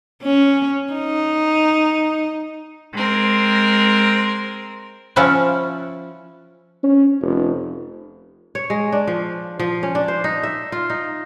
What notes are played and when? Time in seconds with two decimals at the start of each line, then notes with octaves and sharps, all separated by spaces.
0.23 C#4
0.93 D#4
2.94 G#3 C4 A#4
5.16 F3 C#4 E4 C#5 F#5 A5
6.83 C#4
7.21 F1
8.55 C#5
8.70 G#3
8.92 D4
9.07 F3
9.59 F3
9.83 C#4
9.95 D4
10.08 C5
10.24 D#4
10.43 E5
10.72 F4
10.90 D#4